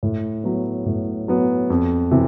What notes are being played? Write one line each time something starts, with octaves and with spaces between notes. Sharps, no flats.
A2
F#3 B3
A2
F#3 B3
F2
C3 E3